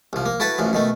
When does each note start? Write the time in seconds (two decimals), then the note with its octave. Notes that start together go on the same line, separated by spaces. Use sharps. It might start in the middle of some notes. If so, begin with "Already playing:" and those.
0.13 C2 F3
0.26 A#3
0.40 E4 F#4 A4 B4 A5
0.58 A1 F#2 F3
0.73 B2 D#3 A3